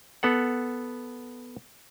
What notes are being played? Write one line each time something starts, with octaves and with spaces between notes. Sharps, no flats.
B3 A4 F#5